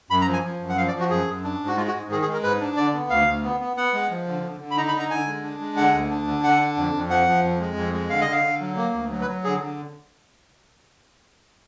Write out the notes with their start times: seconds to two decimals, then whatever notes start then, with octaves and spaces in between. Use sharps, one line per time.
0.10 F#2 B5
0.21 A#5
0.26 F3
0.33 G#5
0.44 F3
0.60 F#2
0.69 F#5
0.77 F3 F5
0.88 D5
0.94 F3
0.99 F#4
1.10 F#2 G#4
1.27 F#2
1.44 D4
1.61 G#2
1.67 F#4
1.77 G#3 F4
1.88 F#4
1.93 G#2
2.10 D#3 G#4
2.22 G#4
2.27 G#3
2.33 A#4
2.43 G#2 B4
2.61 D4
2.77 D3 D5
2.94 B3
3.10 D2 F5
3.27 D2
3.44 B3
3.60 B3
3.77 B3 F#5
3.93 G#3
4.10 F3
4.27 D3
4.43 D3
4.60 D3
4.71 B5
4.77 D#4 A#5
4.88 B5
4.93 D3
5.00 A#5
5.10 D3 G#5
5.27 G#3
5.43 D4
5.60 G#3
5.77 D3 F#5
5.93 D2
6.10 D4
6.27 D3
6.44 D3 F#5
6.61 D4
6.77 F2
6.94 F2
7.10 F3 F#5
7.27 F3
7.43 F2
7.60 G#3
7.76 F2
7.93 G#3
8.10 D3 F5
8.21 D#5
8.27 D3 F5
8.44 D3
8.60 F#3
8.76 A#3
8.94 D2
9.10 F#3
9.21 B4
9.27 F#3
9.44 D3 G#4
9.60 D3